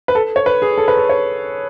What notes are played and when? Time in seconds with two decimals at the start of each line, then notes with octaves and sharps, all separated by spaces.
0.08 B4
0.15 A4
0.36 C#5
0.46 B4
0.62 G#4
0.78 A4
0.88 B4
0.97 A4
1.09 C#5